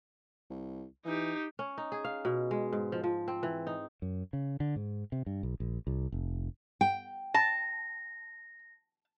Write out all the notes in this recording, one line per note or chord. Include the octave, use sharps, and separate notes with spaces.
C2
E3 D#4 G4
C#4
D#4
G#4
F5
B2
G#3
G#2
F3
F3
C4
E3
D#4
F#2
C#3
D3
G#2
C3
G2
B1
A#1
C2
F1
G5
A5 A#6